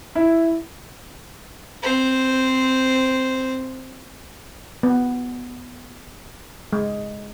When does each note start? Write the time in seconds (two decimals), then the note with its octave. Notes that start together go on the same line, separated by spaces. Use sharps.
0.15 E4
1.82 C4 C5
4.83 B3
6.73 G#3